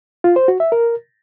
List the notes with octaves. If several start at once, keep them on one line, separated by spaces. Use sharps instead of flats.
F4
C5
F#4
E5
A#4